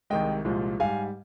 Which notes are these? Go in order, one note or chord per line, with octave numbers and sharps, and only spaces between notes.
C2 C3 D#3 G#3 D#5 G5
C2 A#2 F3 G#3
G#2 G3 F5 G#5